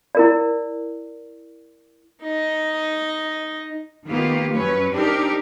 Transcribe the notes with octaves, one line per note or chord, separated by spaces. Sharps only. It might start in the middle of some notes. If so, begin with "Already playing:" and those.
E4 A#4 D5
D#4 D#5
D#3 A#3 B3 F4 G4
F#2 F#3 C#4 B4 C#5
C4 D4 D#4 G4 A#4